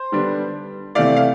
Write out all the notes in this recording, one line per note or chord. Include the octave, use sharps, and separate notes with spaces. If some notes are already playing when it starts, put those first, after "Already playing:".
Already playing: C5
D3 G3 B3 D4
C3 E3 A3 E4 D5 F5
F5